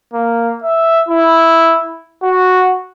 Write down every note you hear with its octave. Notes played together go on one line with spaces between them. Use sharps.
A#3
E5
E4
F#4